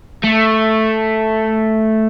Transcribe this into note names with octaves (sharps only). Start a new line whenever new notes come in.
A3